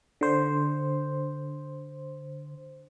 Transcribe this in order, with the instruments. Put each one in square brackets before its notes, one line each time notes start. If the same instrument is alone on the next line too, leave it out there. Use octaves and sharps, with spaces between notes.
[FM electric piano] D3 C5